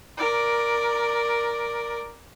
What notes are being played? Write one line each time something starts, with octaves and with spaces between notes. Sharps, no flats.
A#4 D5